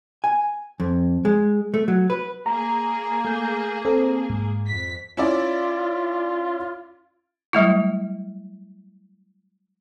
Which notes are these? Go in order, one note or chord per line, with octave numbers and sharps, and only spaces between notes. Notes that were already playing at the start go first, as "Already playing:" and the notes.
G#5
F2
G#3
A3
F#3
B4
A#3 G#4 A#5
A3 G6
C4 A4
G#2
F2 B6
C#4 E4 F4 D5
F#3 G3 A3 E4